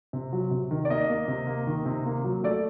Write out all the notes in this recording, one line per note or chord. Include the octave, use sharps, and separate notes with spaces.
C3
F#3
C3
D#3
D5
A#3 D#5
A#3
C3
A#3
D#3
C3
A#3
F#3
A3 D5